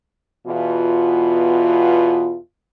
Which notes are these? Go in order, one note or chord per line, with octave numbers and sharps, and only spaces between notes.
E2 B2 E3 F4